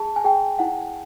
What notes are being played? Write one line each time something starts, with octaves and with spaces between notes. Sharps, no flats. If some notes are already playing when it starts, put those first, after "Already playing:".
Already playing: G#4 A5
G#5
G#4 G5
E4 F#5